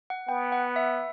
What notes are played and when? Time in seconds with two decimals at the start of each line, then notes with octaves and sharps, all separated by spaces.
0.10 F#5
0.29 B3 G5
0.52 F#5
0.76 E5